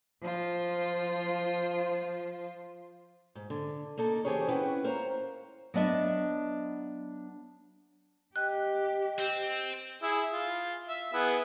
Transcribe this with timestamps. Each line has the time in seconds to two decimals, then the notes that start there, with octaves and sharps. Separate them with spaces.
0.21 F3 F4 C5
3.35 G#2
3.50 D3
3.97 A#3 D#4 A4 A#4
4.25 E3 C#4 G4 G#4 C5 C#5
4.48 C4 C#4 E4 B4 F#5 G5
4.84 A#4 C5 C#5 F5 A#5
5.74 F#3 B3 D4 D#5 E5
8.36 G4 D#5 G5 F#6
9.19 C4
10.02 E4 G#4
10.32 F4
10.88 E5
11.13 B3 E4 G#4